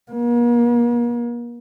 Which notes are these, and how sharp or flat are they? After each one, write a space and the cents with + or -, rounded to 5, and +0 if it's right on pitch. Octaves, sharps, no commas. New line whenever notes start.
A#3 +40